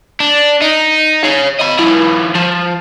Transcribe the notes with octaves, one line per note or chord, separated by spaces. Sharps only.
D4
D#4
C#5 F5
D#5 B5
F3 E4
F3